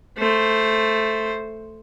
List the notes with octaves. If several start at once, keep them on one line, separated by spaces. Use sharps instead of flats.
A3 C5